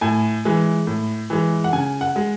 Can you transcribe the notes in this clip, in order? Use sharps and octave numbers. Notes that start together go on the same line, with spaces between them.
A2 G#5
E3 G#3
A2
E3 G#3
F#5
C#3 G#5
F#5
G#3